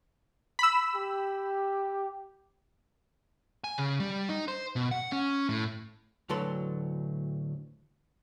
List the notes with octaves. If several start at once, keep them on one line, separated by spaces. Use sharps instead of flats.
B5 E6
G4
G#5
C#3
G3
D#4
C5
B2
F#5
C#4
A2
D2 A2 F#3 A4 B4 C6